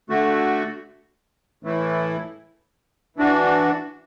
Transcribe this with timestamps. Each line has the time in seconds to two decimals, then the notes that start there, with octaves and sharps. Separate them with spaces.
0.10 D3 A3 F#4
1.63 A2 E3 A3 E4
3.17 E3 D4 F#4